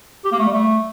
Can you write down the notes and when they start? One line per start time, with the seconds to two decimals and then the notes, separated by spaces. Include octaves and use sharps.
0.25 G4
0.32 A#3
0.39 A3
0.47 G3
0.54 A3